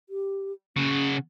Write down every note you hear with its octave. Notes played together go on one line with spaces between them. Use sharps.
G4
C#3 C#4 F#4